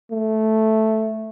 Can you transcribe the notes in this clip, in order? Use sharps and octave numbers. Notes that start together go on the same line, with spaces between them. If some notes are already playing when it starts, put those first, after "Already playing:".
A3